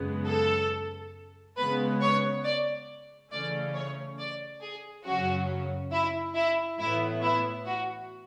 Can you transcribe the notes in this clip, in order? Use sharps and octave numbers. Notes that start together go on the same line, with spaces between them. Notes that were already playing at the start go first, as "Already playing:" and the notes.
Already playing: F#2 C#3 G#3 B3
A4
C#3 G#3 B3 B4
C#5
D5
C#3 E3 A3 C#4 D5
C#5
D5
G#4
F#2 C#3 F#3 C#4 F#4
E4
E4
A2 E3 B3 E4
E4
F#4